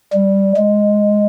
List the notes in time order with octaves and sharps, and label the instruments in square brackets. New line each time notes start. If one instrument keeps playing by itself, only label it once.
[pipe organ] G3
G#3